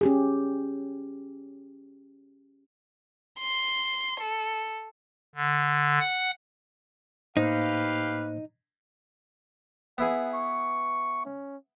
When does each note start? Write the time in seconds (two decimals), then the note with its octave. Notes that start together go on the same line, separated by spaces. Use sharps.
0.01 C#4 G4 G#4
3.39 C6
4.20 A4
5.35 D3
5.99 F#5
7.37 A2 A#3 D#4 G4 B4 C5 F5
9.98 B3 E4 G#4 F#5
10.34 C#6
11.25 C#4